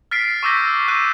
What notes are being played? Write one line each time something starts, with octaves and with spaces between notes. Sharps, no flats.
F6 A6 B6 C7 D7
C#6 D6 E6 G6 A#6 B6
D6 F#6 D#7